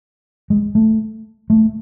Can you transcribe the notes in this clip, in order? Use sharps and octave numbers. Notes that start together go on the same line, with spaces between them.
G#3
A3
A3